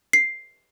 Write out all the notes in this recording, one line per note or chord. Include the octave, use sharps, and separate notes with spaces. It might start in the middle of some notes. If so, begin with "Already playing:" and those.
C7